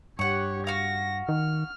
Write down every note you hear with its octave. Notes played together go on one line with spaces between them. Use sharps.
G2 G4 C#5 F#5 C#6
F#4 F5 A#6
D#3 F6